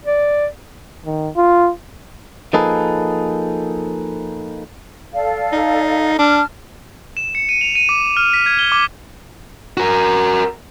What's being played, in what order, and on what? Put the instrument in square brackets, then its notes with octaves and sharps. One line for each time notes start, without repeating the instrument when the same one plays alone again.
[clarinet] D5
[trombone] D#3
F4
[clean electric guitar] F3 A#3 D#4 G#4 A4 B4
[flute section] A4 D5 F5
[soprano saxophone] D#4
[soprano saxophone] D4 [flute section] A5 F6
[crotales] E7
C#7
D#7
F7
D#7
D6
F6
B6
G#6
G7
D6
[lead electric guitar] F#4 A#4